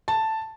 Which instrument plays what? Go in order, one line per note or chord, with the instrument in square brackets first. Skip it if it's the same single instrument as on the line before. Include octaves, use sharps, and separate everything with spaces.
[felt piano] A5